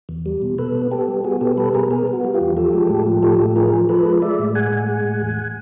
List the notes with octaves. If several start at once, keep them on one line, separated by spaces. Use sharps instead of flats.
E2
G3
B2
B2 A4 B4
B3
B3 G4 A4
G3
B3 F#4 G#4
B2 G4 A4
G3 A4 B4
B2 G#4 A#4
B3 G#4 A#4
B3
F#4
G3
F4 G4
E2
F3 G4 A4
G#3
A2
F3
A2 G4 A4
A2
F3 G#4 A#4
F3
F3 A4 B4
G#3
G#3 D5 E5
A2
G#3 F#5 G#5
A2
G#3
A2
E2